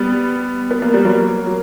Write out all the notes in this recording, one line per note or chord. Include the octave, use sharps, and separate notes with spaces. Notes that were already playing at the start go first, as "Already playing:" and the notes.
Already playing: G3 B3
B3
A#3
G3
F#3 A#3
F#3